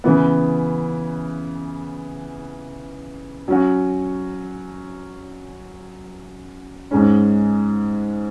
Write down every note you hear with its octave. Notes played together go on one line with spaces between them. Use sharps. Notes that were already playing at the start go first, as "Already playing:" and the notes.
C#3 E3 B3
F#3 C#4 F#4
G#2 G#3 C#4